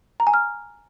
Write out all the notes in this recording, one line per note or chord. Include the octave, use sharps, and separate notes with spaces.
A#5
G#5
F6